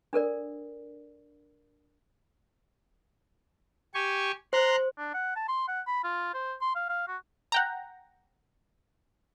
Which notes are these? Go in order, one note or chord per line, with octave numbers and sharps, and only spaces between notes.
D4 A4 A#4 D5
G4 G#5 C#6
C5 A#5 C6 F#6
D4
F#5
A5
C6
F#5
B5
F4
C5
C6
F5
F5
F#4
F#5 G5 A#5